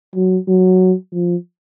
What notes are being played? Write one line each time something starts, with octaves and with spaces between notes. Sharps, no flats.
F#3
F#3
F3